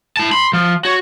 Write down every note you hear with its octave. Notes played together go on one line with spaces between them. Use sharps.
E4 A5
B5 C6
F3 F4
F#4 C#5